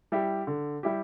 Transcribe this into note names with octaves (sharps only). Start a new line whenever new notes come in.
G3 E4 G4
D3
G3 E4 G4